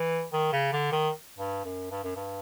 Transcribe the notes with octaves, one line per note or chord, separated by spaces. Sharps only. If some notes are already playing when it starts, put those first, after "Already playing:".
Already playing: E3
D#3
C#3
D3
D#3
G2
F#2
G2
F#2
G2